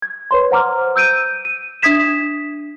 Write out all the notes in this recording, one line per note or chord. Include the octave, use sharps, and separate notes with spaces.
G#6
B4 C#5 C6
C5 F#5 A#5 D6 F6
E6 G6 D7 D#7
D#7
D4 E5 D#6 G#6 B6 E7